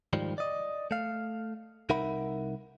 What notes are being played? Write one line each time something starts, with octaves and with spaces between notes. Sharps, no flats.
G#2 D#3 F3 G3
D5 D#5
A3 F5
C2 D#4 A#4 E5 F#5 B5